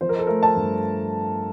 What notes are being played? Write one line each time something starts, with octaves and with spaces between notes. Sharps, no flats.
F3 C5
A#4
A4
A3 A#4
A5
G2